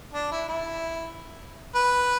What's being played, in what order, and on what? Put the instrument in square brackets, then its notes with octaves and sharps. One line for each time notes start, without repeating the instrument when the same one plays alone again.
[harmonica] D4
E4
E4
B4